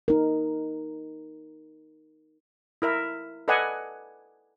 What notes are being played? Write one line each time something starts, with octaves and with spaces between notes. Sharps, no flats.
D#4 A#4
E4 A#4 E5
A4 B4 D5 D#5 F#5 G#5